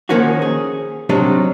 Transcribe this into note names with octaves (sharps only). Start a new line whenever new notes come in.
D#3 F3 A#3 C#4 D#4 F#4
G#4
C3 F#3 G3 D4 D#4